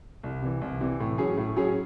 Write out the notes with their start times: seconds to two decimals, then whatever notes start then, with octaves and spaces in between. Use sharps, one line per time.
0.23 C2
0.42 C3 E3
0.62 C2
0.81 C3 E3
1.00 A2
1.18 F#3 C#4 G#4
1.37 A2
1.56 F#3 C#4 G#4